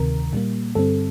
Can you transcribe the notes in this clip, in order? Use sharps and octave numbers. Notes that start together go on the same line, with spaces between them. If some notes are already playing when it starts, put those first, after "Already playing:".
Already playing: D2 C3 D#3 A#4
A#2 G3 A#3
G2 D3 G3 C4 A4